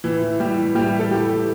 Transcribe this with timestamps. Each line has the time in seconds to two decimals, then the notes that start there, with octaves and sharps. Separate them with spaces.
0.04 A2 E3 E4
0.22 E3
0.40 A2 G3 G4
0.58 E3
0.75 A2 G3 G4
0.92 E3
0.99 A4
1.10 A2 G3 G4
1.29 E3